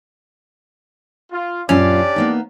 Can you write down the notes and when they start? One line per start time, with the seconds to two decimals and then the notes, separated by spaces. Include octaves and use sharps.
1.32 F4
1.69 F#2 A#2 C#4 D4 F4 G4 D5
2.16 A#3 B3 D#4